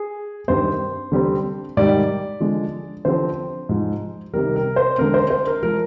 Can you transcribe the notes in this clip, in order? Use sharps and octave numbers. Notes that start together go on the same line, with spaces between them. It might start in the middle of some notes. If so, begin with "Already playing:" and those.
Already playing: G#4
G2 D#3 G3 C4 C5
D3 G3 C4
G#2 D#3 G3 D5
D3 F3 G#3
D3 F3 C4 C5
G#2 F3 G#3
C3 D#3 G3 A#4
A#4
C5
D3 G#3 C4 A#4
C5
C5
A#4
F3 G#3 A#4